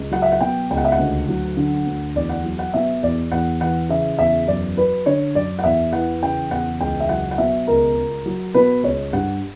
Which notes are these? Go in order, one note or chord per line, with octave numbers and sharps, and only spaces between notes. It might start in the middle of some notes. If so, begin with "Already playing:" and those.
Already playing: C#2
F#3 F#5
E5
F#5
B2 G5
C#2 G5
F#5
E5
F#5
D2
F#3
D3
D2
E2 D5
F#5
F#3
F#5
B2 E5
E2 D5
E2 F#5
E3 F#5
C#3 E5
E2 E5
F#2 D5
F#3 B4
D3 C#5
F#2 D5
F#5
E2 E5
E3 F#5
C#3 G5
E2 F#5
C#2 G5
E5
F#3 F#5
F#5
B2 E5
C#2 A#4
C#2
F#3
B2 B4
C#2 C#5
G2 F#5